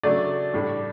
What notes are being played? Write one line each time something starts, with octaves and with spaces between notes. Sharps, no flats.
C#3 F#3 A3 D4 D5
A2 G3 D4